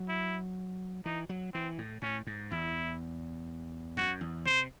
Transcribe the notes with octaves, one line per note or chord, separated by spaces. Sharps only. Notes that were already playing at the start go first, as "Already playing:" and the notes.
Already playing: F#3
E4
E3 D#4
F#3
E3 C4
A2
A2 C#4
G#2
E2 E4
F#2 F#4
E2
C3 C5